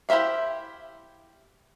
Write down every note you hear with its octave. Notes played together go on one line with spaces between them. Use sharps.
E4 G4 C5 E5 F5